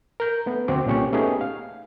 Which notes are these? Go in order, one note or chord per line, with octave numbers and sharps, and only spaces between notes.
A#4 G6
A3 B3
D2 C4 F#4 D6
C2 A#2 C#4 G4 C#6
A3 B3 C#4 D#4 G4 G#4
F5